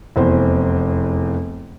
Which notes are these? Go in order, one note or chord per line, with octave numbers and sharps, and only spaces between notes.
F1 E2 C5